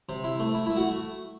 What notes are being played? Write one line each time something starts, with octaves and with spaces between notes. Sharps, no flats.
C3
E4
A3
E4
A3 E4
F#4